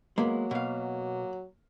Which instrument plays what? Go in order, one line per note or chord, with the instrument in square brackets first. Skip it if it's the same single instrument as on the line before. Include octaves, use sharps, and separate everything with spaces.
[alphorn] F#3 [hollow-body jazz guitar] G#3 B3 [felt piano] A#3
[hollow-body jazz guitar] B2 F5